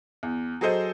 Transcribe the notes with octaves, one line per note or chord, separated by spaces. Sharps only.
E2
F#3 G#4 A4 C5 D#5